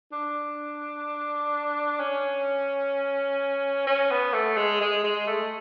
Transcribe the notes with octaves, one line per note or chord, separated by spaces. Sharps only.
D4
C#4
C#4
B3
A3
G#3
G#3
G#3
A3